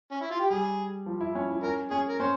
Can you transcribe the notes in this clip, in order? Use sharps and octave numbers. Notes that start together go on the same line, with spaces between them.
C#4
E4
F4
G4
G3 G#4
F3
E4
C#4
E4
C#4 A#4
C#4 G#4
A#4
C#4 C5